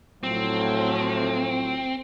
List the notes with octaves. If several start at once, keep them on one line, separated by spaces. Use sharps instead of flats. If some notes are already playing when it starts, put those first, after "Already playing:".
A2 F3 F#3 C4